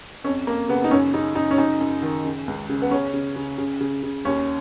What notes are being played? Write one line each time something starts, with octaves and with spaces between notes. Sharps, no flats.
F2 C#4
F2 A#3
C#3 B3
D#4
F#2 C#4
C#3 D#4
C#3 D#4
C#4
F#2 D#4
F#2
D#3
C#3
C#2
C#3
B3
C#3 C#4
C#3
C#3
C#3
C#3
C#3
D#2 C#4